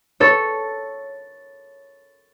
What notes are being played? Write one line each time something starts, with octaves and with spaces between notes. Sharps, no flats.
A4 C#5